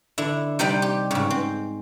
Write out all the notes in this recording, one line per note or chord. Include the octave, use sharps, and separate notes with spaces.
D3 E4
C3 G3 D#4 C5 G5 B5
G4
G#2 C#3
C4